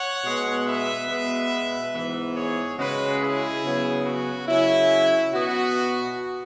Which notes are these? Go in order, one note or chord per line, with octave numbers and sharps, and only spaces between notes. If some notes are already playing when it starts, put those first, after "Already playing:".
Already playing: C#5 F#5
B2 G#3 B3
B4 E5
B2 G#3 B3
G#2 E3 B3
G#4 C#5
C#3 G#3 C#4 F#4 B4
E4 G#4
C#3 F#3 B3
F#4
C#3 F#3 C#4 E4
B2 B3 F#4